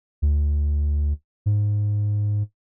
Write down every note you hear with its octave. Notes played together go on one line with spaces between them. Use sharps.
D2
G#2